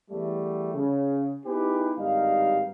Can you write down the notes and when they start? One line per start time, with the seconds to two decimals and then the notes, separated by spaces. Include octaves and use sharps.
0.11 E2 G3 A3
0.74 C#3
1.46 B3 D#4 E4 G4 G#4 B4
1.98 G#1 G2 G3 D#4 F5